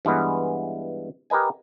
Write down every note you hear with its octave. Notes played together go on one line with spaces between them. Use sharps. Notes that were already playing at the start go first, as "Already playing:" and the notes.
G2 E3 G#3 B3
G4 A#4 B4 D#5 G#5